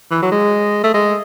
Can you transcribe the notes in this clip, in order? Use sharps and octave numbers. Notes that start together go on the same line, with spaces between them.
E3
F#3
G#3
A3
G#3